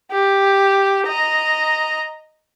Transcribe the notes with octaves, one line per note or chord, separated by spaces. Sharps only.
G4
D#5 A#5